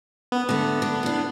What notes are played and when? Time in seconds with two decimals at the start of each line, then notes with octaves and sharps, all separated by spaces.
0.32 B3
0.49 D3 A3 B3
0.82 D4
1.03 A2 D4